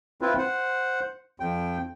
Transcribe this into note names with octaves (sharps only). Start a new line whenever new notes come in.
C4 E4 F4 B4
C5 F#5
F2 G5